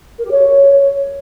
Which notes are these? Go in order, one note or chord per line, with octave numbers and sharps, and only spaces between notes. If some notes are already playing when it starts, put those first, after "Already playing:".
A#4
G4
C#5